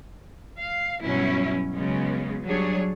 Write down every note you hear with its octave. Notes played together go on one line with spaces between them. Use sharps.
F5
G2 B2 F#3 C#4 E4
C#3 F#3 G#3 B3 C#4
F#3 G3 D4 G#4 C#5